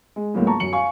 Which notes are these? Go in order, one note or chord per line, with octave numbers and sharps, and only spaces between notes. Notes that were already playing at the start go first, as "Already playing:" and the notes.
G#3
C#2 A2 F#3 A#3 B3
A5 A#5 C#6
F#2 C#7 F#7
F5 G#5 C#6